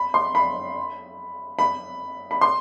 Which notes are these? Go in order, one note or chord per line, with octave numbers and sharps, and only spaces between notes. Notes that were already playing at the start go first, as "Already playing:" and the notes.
Already playing: B5
C6
B5
B5
B5
C6